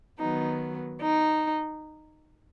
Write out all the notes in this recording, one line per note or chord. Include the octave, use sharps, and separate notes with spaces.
D#3 F#3 B3 D#4
D#4